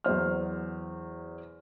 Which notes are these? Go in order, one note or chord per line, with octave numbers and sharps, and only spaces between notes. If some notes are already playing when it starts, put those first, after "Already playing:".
E2 F#3 C5 F6